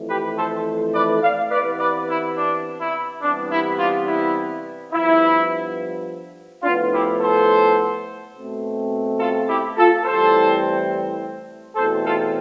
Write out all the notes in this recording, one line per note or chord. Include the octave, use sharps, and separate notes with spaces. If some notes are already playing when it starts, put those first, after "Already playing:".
Already playing: F2 E3 A3
G4 B4
A4 C5
B4 D5
D5 F5
C3 E3 B3 B4 D5
B4 D5
E4
D4
E4
C3 E3 G3 B3 D4
E4
D4 F4
E4
G2 F3 B3 E4
A2 F3 B3 D4 F4
E4 G4
A4 C5
B2 A3 C4
F4 A4
E4 G4
F4 A4
A2 E3 G3 C4 A4 C5
E2 B2 A3 C4 A4 C5
F4 A4